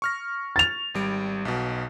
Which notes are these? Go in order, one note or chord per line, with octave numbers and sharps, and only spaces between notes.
C#6 F6 A#6
A6 F7
G#1 G3 D7
B1 B2